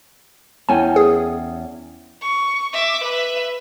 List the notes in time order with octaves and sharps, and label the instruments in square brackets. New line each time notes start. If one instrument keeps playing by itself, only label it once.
[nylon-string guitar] E2 C#4 G5 [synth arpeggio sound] G#5
[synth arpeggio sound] G#4
[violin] C#6
E5 D6
B4 E5